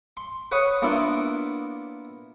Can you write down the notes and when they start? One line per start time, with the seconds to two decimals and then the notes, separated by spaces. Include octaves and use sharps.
0.17 C6
0.52 B4 C#5 F#5 D#6
0.82 A#3 B3 D4 E4 F4